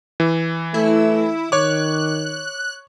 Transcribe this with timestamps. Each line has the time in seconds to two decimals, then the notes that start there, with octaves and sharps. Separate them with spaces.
0.20 E3
0.74 A3 E4
1.52 D#3 C#5 D6 F#6